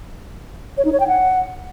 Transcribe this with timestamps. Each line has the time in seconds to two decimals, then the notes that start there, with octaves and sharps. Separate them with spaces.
0.78 C#5
0.85 D#4
0.93 C#5
1.00 G5
1.08 F#5